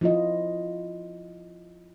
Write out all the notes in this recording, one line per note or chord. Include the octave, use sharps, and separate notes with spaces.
F3 E4 F4 D#5